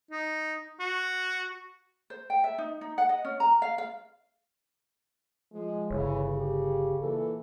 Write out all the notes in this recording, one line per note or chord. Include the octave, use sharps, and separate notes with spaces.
D#4
F#4
C5
G5
E5
D#4
D#4
F#5
D#5
C#4
A#5
F5
F5
F3 G#3
G1 C#3 E3 C#5
G4
A#2 E3 A4